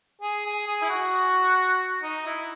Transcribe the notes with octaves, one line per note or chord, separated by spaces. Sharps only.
G#4
G#4
G#4
E4
F#4
D#4
E4